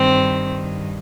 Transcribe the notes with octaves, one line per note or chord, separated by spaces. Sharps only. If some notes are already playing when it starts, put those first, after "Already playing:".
Already playing: G2 D#3 C4